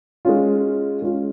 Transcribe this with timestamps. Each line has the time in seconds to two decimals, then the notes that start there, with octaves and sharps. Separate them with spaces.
0.25 G#3 C#4 F4
1.02 G#3 C#4 F4